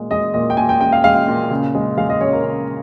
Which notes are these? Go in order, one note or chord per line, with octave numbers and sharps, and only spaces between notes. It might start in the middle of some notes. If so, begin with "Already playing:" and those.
Already playing: A#2 G#3
G#3 D#5
A#2 D#5
G5
A#2 G#5
G5
G#3 G5
F5
G#3 F5
A#2
C#3
G#3
G#3 F5
D#5
C#3 C#5
A#4
C#3